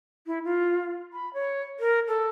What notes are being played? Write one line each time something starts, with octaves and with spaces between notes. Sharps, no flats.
E4
F4
B5
C#5
A#4
A4